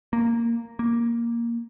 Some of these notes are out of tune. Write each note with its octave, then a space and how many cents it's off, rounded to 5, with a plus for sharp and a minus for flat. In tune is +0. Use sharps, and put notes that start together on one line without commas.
A#3 -5
A#3 +5